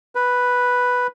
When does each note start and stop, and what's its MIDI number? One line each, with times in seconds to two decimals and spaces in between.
0.15 1.07 71